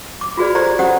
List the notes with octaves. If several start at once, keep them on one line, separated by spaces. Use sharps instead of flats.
D6
F4 F#4 G#4 B4 D5
G4 A4 C5 D5 A#5
C#4 G4 C5 C#5 F#5 D#6